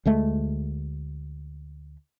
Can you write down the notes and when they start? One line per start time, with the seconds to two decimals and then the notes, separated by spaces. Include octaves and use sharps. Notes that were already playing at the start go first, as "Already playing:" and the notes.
0.06 D2 G#3 A3